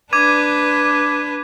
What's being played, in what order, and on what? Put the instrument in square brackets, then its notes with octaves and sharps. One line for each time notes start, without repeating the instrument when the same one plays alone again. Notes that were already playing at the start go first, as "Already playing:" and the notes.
[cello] D4 B4 [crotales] D6 G#6 D#7